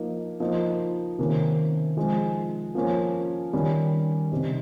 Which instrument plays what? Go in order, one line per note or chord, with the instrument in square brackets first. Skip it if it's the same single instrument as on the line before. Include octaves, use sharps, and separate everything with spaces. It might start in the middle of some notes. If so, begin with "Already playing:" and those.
Already playing: [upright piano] F3 A#3 D#4
F3 A#3 D#4
C3 D#3 A#3 C#4
F3 G#3 C4 D#4
F3 A#3 C#4
D#3 G3 C#4
C3 G3 C4 D#4